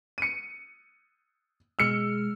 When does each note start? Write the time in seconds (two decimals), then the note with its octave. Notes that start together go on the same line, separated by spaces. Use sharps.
0.18 C#7 D#7
1.79 B2 G#3 E6 F6 C#7